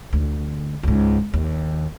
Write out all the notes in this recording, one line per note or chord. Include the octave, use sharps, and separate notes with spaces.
D2
C#2 G#2
D#2